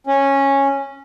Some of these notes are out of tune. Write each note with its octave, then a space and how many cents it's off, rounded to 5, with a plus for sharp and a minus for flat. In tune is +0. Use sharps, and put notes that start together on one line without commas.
C#4 -10